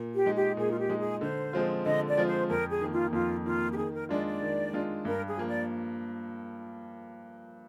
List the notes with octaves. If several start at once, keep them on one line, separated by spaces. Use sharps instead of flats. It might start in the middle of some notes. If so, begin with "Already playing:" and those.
Already playing: A#2
G4
G#3 D#4
G4
A#2 G#4
F4
G4
G#3 D#4
G#4
D3 C5
F3 G#3 C4 F4
D3 D#5
D5
F3 G#3 C4 F4
C5
F2 A#4
G#4
D#3 A#3
F4
F2 F4
D#3 A#3 F4
G4
D#3 G#4
A#4
G#3 D4 F4 D5
D5
D#3
G#3 D4 F4
G2 A#4
G#4
F3 A#3
D5